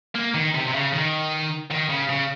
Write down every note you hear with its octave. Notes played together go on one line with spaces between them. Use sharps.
A#3
D#3
C3
C3
C#3
D#3
D#3
C#3
C#3